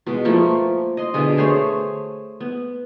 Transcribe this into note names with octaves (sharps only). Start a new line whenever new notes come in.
B2 G#3
F3 A3 A#3 C#6
D#5 C6
B2 D3 G#4
A3 G#4 C5 C#5
B3